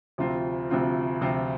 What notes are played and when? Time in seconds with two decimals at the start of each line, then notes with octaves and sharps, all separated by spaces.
0.18 D2 C3 F3 C4 F4
0.70 D2 C3 F3 C4 F4
1.21 D2 C3 F3 C4 F4